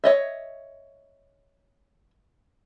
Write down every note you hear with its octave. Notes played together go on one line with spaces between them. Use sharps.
C#5 D#5 E5